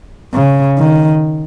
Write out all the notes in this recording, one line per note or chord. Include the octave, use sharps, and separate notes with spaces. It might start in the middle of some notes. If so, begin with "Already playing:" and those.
C#3
D#3